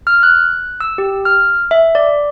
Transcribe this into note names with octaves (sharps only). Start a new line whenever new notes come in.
F6
F#6
E6
G4
F6
E5
D5